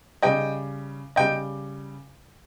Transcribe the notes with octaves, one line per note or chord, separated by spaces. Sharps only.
C#3 G3 D#5 G5
C#3 G3 D#5 G5